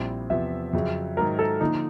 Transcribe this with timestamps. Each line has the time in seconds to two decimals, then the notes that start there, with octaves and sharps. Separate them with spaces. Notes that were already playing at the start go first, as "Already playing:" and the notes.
Already playing: A#1 A#2 G3 C4 E4
0.30 E2 C3 F3 E5
0.73 F2 C#3 F#3
1.17 G#2 D#3 F#3 A#4
1.39 A4
1.61 D3 F3 A#3 D#4